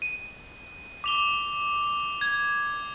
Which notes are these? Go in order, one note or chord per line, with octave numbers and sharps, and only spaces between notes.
D#7
D6 F7 G7
G#6